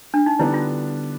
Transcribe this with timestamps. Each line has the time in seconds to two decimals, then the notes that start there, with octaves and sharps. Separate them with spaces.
0.14 D4
0.26 D#4
0.39 D3 G3 B3 D4 E4
0.54 F4